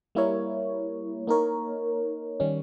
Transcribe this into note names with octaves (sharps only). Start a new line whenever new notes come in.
G3 A#3 E4 A#4 C#5
A#3 D#4 A#4 C#5
D#3 G3 C#4